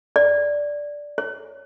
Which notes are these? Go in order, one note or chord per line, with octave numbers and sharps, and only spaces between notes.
D5
C#5